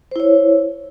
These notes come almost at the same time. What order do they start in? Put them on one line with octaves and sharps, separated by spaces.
C5 E4 C#5